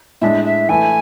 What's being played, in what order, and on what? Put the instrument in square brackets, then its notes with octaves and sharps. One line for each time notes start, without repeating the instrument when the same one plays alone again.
[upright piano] A2 G#3 D4 [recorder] E5
[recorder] E5
[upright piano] E3 A3 E4 A4 [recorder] G#5